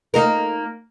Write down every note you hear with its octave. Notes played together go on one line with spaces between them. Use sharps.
A#3 D#4 A#4